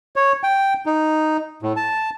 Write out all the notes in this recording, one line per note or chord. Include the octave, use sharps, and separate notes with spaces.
C#5
G5
D#4
A2
A5